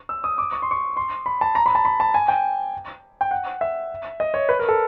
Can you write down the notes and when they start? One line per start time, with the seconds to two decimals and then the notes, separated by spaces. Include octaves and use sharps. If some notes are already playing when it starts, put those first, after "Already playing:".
0.09 E6
0.24 D#6
0.38 D6
0.52 C#6
0.62 C6
0.71 C#6
0.97 C6
1.26 B5
1.41 A5
1.55 A#5
1.66 B5
1.75 A5
1.85 B5
2.00 A5
2.14 G#5
2.28 G5
3.21 G5
3.31 F#5
3.61 E5
4.20 D#5
4.34 C#5
4.49 B4
4.59 A#4
4.69 A4